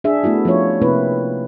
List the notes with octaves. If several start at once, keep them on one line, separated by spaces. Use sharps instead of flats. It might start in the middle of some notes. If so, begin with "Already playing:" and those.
D4 G#4 E5
A3 B3 E4 F#4
F3 C#4 F4 C#5
C3 A#3 C4 E4 B4